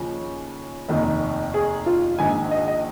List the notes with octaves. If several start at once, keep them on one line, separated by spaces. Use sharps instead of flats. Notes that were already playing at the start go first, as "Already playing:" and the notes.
Already playing: D#2 C#3 F3
F1 D#2 D#3
G#4
F4
A#1 G#2 D#3 G#5
D#5
D#5